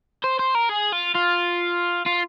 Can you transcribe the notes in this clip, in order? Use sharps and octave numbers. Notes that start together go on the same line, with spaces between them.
C5
C5
A#4
G#4
F4
F4
F4